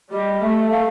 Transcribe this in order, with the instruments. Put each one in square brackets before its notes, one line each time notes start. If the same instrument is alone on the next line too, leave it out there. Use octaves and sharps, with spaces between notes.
[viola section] G3 [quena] D#5
[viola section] A3 [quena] E5
[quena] F5